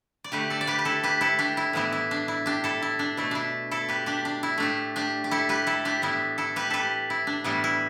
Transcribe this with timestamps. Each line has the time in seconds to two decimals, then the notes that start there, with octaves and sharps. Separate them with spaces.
0.24 D5
0.32 D3 A3 G4 B4
0.50 A4 D5
0.61 D5
0.67 G4 B4
0.79 B4
0.85 E4 A4
1.04 G4 B4
1.21 E4 A4
1.39 D4 G4
1.57 E4
1.73 A2 E3 B3 E4
1.93 E4
2.11 D4
2.28 E4
2.46 D4 G4
2.64 E4 A4
2.82 E4
2.99 D4
3.17 B2 A3 E4
3.31 D4 E4
3.71 E4 A4
3.89 G4 B4
4.06 D4 G4
4.25 D4
4.43 E4
4.58 A2 A3 D4 G4
4.96 D4 G4
5.24 G4
5.31 E4 A4
5.49 G4 B4
5.67 E4 A4
5.85 D4 G4
6.02 A2 E3 B3 E4
6.38 E4 A4
6.56 G4 B4
6.71 G4 A4 B4
7.10 E4
7.27 D4
7.44 A2 E3 G3 B3 E4
7.64 E4